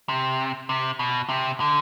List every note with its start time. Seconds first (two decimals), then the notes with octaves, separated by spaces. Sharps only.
0.09 C3
0.69 C3
0.99 B2
1.29 C3
1.60 D3